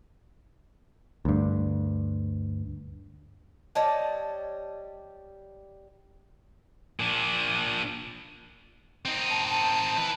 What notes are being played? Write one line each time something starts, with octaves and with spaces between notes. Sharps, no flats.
D2 G2
G3 C#5 D#5 A5
A#2 D4
C4 D#4
A5
A5
E4 B4